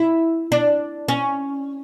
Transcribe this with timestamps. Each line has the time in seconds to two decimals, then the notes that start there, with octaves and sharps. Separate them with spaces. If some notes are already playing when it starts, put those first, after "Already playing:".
Already playing: E4
0.52 D4
1.08 C#4